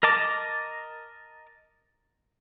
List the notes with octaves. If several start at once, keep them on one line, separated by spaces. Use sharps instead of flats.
A#4 D#5 A5 D6